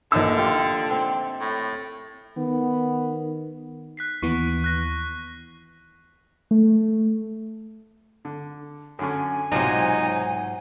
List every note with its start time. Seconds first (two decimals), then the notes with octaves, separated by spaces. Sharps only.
0.12 A#1 D3 D#4 E6
0.37 F4 G4
0.91 C4
1.41 A2
2.37 D#3 B3
3.97 F#6 B6 C7
4.23 D#2 E3 B3 C#6
4.64 F#6 A#6
6.51 A3
8.25 D3
8.99 F#2 D3 C#4 G#5
9.52 B1 G#2 C3 F#3 D#4 F4 G5